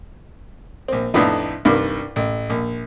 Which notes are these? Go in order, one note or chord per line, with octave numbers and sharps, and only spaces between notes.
A#1 C4
F2 A2 B3 D4 D#4
C2 G2 D#3
A1
A#1